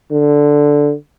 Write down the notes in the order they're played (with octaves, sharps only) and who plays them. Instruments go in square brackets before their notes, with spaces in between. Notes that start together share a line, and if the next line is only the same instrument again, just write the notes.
[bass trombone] D3